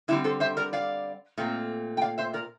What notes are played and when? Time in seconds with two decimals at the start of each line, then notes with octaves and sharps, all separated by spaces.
0.08 D3 G3 C4 E4
0.24 A4 C5
0.40 C5 E5
0.57 A#4 D5
0.73 D5 F5
1.38 A#2 A3 C4
1.97 G5
2.02 D5 F5
2.18 C5 E5
2.33 A#4 D5